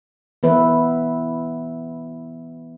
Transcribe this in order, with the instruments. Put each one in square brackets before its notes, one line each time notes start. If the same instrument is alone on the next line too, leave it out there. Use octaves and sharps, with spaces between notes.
[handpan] E3 B3 B4 E5